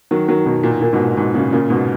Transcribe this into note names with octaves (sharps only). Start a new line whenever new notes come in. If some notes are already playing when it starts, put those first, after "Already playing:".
D#3 F#3
D#3 F#3
B2 D#3
A#2
A#2
G#2 B2
A#2
G#2 B2
A#2 C#3
A#2 C#3
G#2 B2